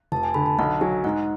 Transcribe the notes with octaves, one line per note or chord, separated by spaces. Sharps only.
F1 A5
G#5
D3 B5
A5
B1 F#5
F#3 G#5
G#2 F#5